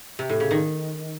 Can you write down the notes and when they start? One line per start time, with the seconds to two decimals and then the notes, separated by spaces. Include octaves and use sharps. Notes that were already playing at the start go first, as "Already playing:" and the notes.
0.19 C3
0.29 A2
0.40 C#3
0.51 D#3